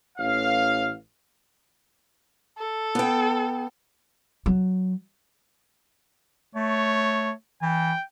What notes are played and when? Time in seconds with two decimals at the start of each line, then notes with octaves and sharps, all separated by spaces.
0.19 A1 F5
2.58 A4
2.95 B3 G5
4.46 F#3
6.56 A3 C#5
7.62 E3 G5